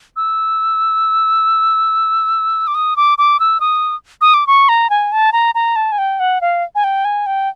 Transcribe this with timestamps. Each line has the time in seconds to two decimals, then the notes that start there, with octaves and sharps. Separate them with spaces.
0.16 E6
2.67 D6
2.75 D#6
2.96 D6
3.18 D6
3.40 E6
3.60 D#6
4.21 D#6
4.34 D6
4.47 C#6
4.69 A#5
4.90 G#5
5.12 A5
5.33 A#5
5.55 A#5
5.76 A5
5.92 G#5
5.98 G5
6.20 F#5
6.41 F5
6.75 G#5
6.84 G5
7.05 G#5
7.26 G5